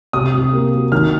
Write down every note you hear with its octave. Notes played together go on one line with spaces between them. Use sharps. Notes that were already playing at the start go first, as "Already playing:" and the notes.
C3 D#6
C3
A#3
F#3
D#3 F6